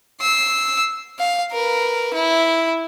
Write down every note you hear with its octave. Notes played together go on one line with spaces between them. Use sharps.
E6 C7
F5
A#4 B4
E4